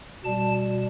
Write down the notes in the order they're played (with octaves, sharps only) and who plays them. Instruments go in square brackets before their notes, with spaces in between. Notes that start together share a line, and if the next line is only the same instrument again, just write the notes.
[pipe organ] B2 G3 A5